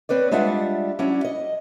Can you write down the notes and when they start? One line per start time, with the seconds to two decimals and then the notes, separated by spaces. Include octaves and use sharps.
0.09 C4 B4 C#5 D5
0.31 G3 G#3 D4 F4 E5 F#5
0.99 F#3 C#4 D4 E4
1.25 D#5